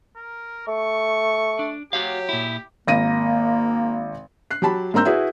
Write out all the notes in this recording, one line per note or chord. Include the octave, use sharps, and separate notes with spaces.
A#4
A3 C#6
D4
F#3 F#4 G4 C#5 F5
A#2 E4
G#1 A#3 A#6 D#7
F#6 C7
F#3 G4 A5 B5
G#2 A#3 C4 A#5 E6 G6
E4 F#4 G#4 B4